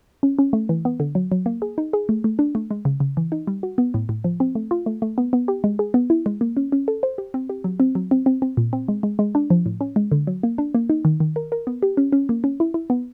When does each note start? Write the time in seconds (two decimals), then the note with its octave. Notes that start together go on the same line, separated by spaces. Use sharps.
0.23 C#4
0.39 C#4
0.53 A3
0.69 E3
0.85 B3
1.00 D3
1.15 F#3
1.32 F#3
1.46 A#3
1.62 G#4
1.78 D#4
1.93 G#4
2.09 A3
2.24 A3
2.39 D4
2.55 A3
2.71 G#3
2.85 C#3
3.00 C#3
3.17 E3
3.32 D#4
3.47 G3
3.63 F#4
3.78 B3
3.94 A2
4.09 A2
4.24 F3
4.40 C4
4.55 A3
4.71 F4
4.86 A3
5.02 A3
5.18 B3
5.33 B3
5.48 G4
5.64 G#3
5.79 G#4
5.94 B3
6.10 E4
6.26 G#3
6.41 A#3
6.57 C#4
6.72 C#4
6.88 A4
7.03 C5
7.18 G4
7.34 C4
7.50 G4
7.64 F#3
7.80 C4
7.95 F#3
8.11 C4
8.26 C4
8.42 C4
8.57 A#2
8.73 C4
8.88 G#3
9.03 G#3
9.19 G#3
9.35 D4
9.50 F3
9.66 A2
9.81 C#4
9.96 G#3
10.12 D3
10.27 F#3
10.43 A#3
10.58 D4
10.75 A#3
10.90 D#4
11.05 D#3
11.20 D#3
11.36 A#4
11.52 A#4
11.67 B3
11.83 G4
11.97 C#4
12.13 C#4
12.29 A#3
12.44 C#4
12.60 E4
12.74 E4
12.90 B3